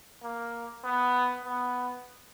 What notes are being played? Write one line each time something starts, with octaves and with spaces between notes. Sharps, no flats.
A#3
B3
B3